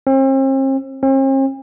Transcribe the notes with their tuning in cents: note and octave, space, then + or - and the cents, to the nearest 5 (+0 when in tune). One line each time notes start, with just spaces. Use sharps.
C4 +40
C4 +45